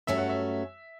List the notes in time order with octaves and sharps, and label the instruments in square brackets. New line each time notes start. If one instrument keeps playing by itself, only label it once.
[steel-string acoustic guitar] G2 F#3 A3 C#4 F#4 [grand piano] E5
[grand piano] F#5
E5